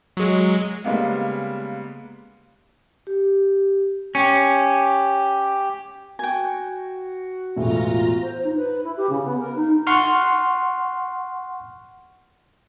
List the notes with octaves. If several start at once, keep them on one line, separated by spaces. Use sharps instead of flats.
F#3 G#3
C#3 G3 G#3 A#3 B3
G4
C#4 G4
F#4 G5 G#5
E1 A2 F4 G#4 A#5
C5
D#4
B4
E4
G4
C#3
B3
A#4
D#4
F#5 C6 C#6 F6